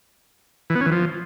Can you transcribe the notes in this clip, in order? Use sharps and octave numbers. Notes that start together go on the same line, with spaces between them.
E3
B3
C#4
E3
F3